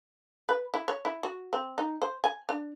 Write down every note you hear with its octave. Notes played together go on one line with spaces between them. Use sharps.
B4
E4
C#5
E4
F#4
C4
D#4
C5
G#5
D4